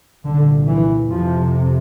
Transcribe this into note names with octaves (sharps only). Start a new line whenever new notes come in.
C2 A#2 D3
E3
F2 C3 F3